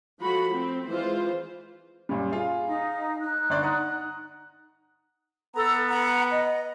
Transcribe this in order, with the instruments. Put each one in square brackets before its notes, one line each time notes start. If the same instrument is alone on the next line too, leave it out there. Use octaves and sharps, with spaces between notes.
[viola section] F3 F#4 A4 B5
C4
E3 G#3 F4 C5
[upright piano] F#2 A#2 G3
F4 G#4 F5
[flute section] D#4
D#4 F#6
[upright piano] G1 D5 C6
F#5 A#5 D#6
[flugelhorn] B3 [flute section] A4 A#5 E6
[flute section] F#5 A#5
D#5